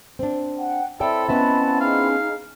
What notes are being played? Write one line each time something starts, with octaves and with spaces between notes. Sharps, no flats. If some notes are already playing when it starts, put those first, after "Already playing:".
C4 D4
F#5 G5
C4 E4 A4 C#5 D5 E5 G5
B3 C#4 D#5 E5 F#5 A5 B5
D#4 G#4 F5